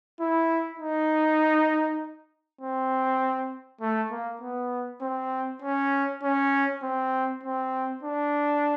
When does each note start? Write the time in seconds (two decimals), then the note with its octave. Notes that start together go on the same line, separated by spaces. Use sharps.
0.20 E4
0.80 D#4
2.61 C4
3.81 A3
4.11 A#3
4.42 B3
5.01 C4
5.62 C#4
6.23 C#4
6.83 C4
7.44 C4
8.03 D4